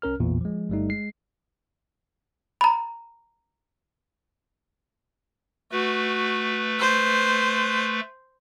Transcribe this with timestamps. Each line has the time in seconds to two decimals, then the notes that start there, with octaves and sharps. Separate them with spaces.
0.02 C2 C#4 A#4 F6
0.20 A1 E2 A#2 E3
0.41 F3 G#3
0.69 G1 G2 G3 A3 D#4
0.89 G#3 C7
2.61 A#5 B5
5.72 A3 F#4 B4
6.79 C5